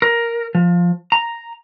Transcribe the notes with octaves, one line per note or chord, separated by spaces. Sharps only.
A#4
F3
A#5